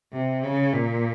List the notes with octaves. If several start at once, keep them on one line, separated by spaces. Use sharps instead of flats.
C3
C#3
A#2